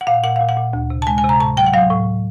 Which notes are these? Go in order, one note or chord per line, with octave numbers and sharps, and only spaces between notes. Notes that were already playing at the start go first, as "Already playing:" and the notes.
F#5
A#2 F5
A#2 F#5
A#2 F5
F#5
A#2
D2
C3
A5
G#3 G#5
G#5
C3
A#5
A2 A5
F#3 G5
F#5
F#3 F5
A2